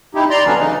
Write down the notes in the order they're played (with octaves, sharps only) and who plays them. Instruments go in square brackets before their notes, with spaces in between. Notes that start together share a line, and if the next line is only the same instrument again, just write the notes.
[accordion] D#4 E4 G4
D5 A#5 C6
D3 E3 F#3 B3 C#4 D4
C#3 E3 D#4